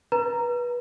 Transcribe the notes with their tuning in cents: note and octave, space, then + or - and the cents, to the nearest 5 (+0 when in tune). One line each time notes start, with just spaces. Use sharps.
B4 -25 A#5 +0